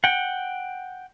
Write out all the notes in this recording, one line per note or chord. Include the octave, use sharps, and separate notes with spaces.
F#5 G5